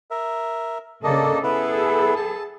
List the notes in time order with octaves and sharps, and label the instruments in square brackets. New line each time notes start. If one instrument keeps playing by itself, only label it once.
[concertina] A#4 E5
[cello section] C#3 A4 [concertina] A#3 D4 D#5
[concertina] B3 E4 [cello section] G#4 A4
[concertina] A5